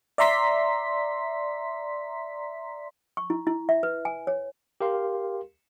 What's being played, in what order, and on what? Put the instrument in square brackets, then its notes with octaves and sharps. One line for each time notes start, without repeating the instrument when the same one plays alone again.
[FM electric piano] D5 E5 A#5 C6 B6
[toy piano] C#6
E4
E4
E5
B4
G#5
C#5
[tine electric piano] G4 A#4 F5 C6